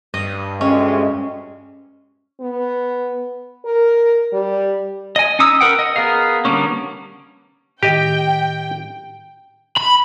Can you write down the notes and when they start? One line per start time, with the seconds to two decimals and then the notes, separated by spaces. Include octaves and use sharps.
0.14 G2 D#5
0.61 D2 C3 G#3 C#4
2.41 B3
3.65 A#4
4.33 G3
5.16 D#5 G#5
5.39 C#4 D#4 D#6 E6
5.61 A#4 B4 F#5 G5
5.79 D#5
5.96 B3 G#4 A#4 F5
6.45 D3 G3 A#3 B3 C#4
7.83 A2 D#3 G4 D#5 G5
9.77 B5